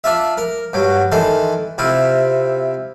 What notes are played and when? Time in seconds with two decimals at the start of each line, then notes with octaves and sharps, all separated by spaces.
0.04 D4 F4 E5
0.38 A#4
0.73 G2 F#3
1.12 D#3 E3 A4 C6
1.78 C3 E4 F4